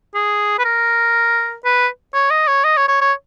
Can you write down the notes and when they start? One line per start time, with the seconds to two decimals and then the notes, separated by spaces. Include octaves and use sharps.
0.15 G#4
0.59 B4
0.65 A#4
1.65 B4
2.14 C#5
2.31 D#5
2.48 C#5
2.64 D#5
2.77 C#5
2.89 C#5
3.02 C#5